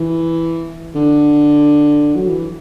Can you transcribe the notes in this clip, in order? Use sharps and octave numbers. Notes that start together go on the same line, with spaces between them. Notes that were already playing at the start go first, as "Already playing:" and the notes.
Already playing: E3
D3
F#3
E3